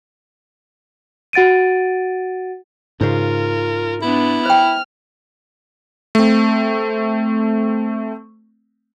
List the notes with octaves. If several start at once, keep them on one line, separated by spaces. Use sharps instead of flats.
F#4 F#5 A6 D7 D#7
G#2 C#3 F4 A#4
B3 D4 E4
C5 G5 F6
A3 C4